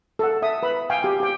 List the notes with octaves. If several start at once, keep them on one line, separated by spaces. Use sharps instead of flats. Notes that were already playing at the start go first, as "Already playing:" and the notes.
A4 F#5
E5 D#6
B4 B5
F5 G5 G#5
G4
G4 G5